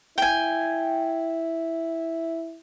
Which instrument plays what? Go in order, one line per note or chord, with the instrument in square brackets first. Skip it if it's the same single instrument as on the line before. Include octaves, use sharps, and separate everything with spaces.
[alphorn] E4 [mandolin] G5 G#5